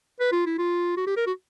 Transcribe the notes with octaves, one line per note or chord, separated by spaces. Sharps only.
B4
F4
E4
F4
F#4
G4
A#4
F#4